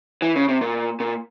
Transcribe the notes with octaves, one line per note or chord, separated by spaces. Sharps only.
E3
C#3
C3
A#2
A#2